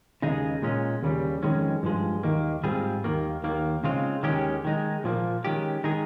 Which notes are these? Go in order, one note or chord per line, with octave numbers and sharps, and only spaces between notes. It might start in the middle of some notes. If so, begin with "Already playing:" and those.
D#2 C#3 G#3 D#4 G#4
A#2 G#3 C#4
D#2 C#3 G3
F2 D#3 G#3 C#4
G2 F3 G#3
D#2 D#3 A#3
G#2 G3 C4 F4 G#4
D#2 D#3 A#3
D#2 D#3 A#3
C#3 G#3 C4 F4
D#2 D#3 G#3 C#4 G4
D#3 G#3 D#4
A#2 F3 A#3
D#3 G#3 C#4 G4
D#3 G#3 D#4 G#4